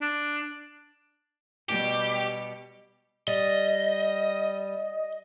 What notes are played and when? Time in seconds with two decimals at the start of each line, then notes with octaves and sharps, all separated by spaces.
0.02 D4
1.69 B2 G3 G4
3.28 G3 D#5